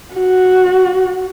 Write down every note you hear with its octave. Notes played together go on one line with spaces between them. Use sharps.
F#4